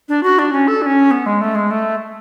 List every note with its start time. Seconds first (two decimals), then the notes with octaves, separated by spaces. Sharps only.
0.09 D4
0.23 F#4
0.39 D4
0.53 C#4
0.68 A4
0.82 D4
0.86 C#4
1.11 B3
1.26 G#3
1.41 A3
1.55 G#3
1.71 A3